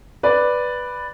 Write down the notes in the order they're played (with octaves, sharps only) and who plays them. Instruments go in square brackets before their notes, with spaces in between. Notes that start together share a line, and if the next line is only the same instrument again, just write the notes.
[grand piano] B4 D5